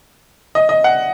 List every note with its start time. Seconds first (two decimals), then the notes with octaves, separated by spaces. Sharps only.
0.55 D#5
0.69 D#5
0.84 F#5